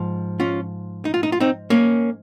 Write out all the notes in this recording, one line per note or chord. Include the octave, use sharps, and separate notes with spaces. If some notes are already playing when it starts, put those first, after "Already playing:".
Already playing: G#2 F3
C#4 F4
D#4
F4
D#4
F4
C4 D#4
A#3 C#4